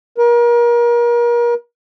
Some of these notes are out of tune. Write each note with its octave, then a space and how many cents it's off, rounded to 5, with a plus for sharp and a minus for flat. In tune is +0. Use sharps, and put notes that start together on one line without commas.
A#4 +35